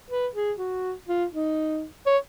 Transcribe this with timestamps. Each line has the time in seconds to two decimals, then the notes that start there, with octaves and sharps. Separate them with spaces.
0.10 B4
0.35 G#4
0.58 F#4
1.08 F4
1.33 D#4
2.06 C#5